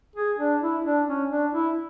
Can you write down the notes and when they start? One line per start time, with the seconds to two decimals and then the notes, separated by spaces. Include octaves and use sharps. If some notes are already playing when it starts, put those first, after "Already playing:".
0.16 G#4
0.39 D4
0.62 E4
0.85 D4
1.08 C#4
1.30 D4
1.53 E4